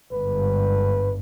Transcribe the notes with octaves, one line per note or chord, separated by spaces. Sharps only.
G1 G#2 B4